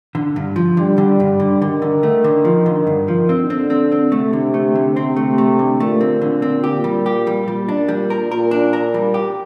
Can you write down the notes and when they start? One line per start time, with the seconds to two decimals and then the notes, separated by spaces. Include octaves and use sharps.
0.15 D3
0.36 G2
0.56 F3
0.77 D3 G3
0.98 D3
1.20 G2
1.40 D3
1.61 D3 D#3
1.82 D3
2.03 A3
2.24 D3
2.45 F3
2.66 D3
2.87 G2
3.08 F3
3.29 D3 C4
3.50 C4
3.70 C4
3.92 C4
4.12 C3 A3
4.33 D3
4.54 A3
4.75 D3
4.96 C3 C4
5.16 A3
5.38 A3
5.59 D3
5.80 A#2 A3
6.01 C4
6.22 D3
6.42 C4
6.63 A#2 G4
6.84 G3
7.06 G4
7.27 G3
7.47 A#2 G3
7.68 D4
7.88 G3
8.10 A#4
8.31 A#2 A#4
8.51 D4
8.73 A#4
8.94 G3
9.14 G4